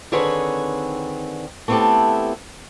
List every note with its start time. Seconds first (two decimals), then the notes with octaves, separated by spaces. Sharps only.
0.12 D3 D#3 C4 G#4 B4 C#5
1.68 A3 B3 C4 E4 G4 A4